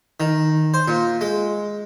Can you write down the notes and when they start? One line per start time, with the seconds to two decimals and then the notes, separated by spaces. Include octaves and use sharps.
0.20 D#3
0.74 C5
0.88 A#2
1.21 G#3